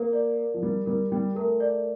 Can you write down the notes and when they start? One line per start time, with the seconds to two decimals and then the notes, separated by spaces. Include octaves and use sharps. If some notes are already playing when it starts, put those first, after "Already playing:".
Already playing: A#3 A#4
0.13 D5
0.37 A#4
0.54 F3
0.62 G3 A#4
0.86 G3 A#4
1.12 G3 G5
1.35 A3 A#4
1.60 D5